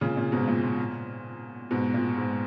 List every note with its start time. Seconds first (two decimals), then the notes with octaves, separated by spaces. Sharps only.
0.01 A#2 C#3
0.17 A#2
0.32 G#2 B2
0.48 A#2
0.63 A#2
1.71 G#2 B2
1.94 A#2
2.18 G#2